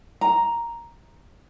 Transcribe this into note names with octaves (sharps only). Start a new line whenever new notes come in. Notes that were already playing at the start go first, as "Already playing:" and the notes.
A#5